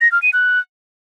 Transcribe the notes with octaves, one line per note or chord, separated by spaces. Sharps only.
A#6
F6
D#7
F#6